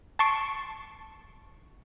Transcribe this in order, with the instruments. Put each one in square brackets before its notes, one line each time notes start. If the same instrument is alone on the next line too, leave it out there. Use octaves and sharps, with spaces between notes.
[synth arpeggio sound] A5 C6 C#6 D7